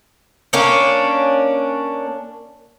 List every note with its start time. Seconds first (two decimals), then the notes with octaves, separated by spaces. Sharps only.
0.53 A#3 C#4 D4